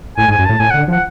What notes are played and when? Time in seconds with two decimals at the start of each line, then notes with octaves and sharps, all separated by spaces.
0.17 A2 G#5
0.28 G#2
0.32 G#5
0.39 F#2
0.45 A2 A5
0.60 A2 G#5
0.71 D3 F#5
0.88 F3 F#5